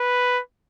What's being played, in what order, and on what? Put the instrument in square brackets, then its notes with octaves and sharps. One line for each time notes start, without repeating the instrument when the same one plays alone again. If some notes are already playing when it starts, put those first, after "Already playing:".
Already playing: [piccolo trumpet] B4